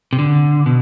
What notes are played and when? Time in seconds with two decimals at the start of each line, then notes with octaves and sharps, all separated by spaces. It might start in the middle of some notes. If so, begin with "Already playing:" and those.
0.13 C3
0.19 D3
0.66 B2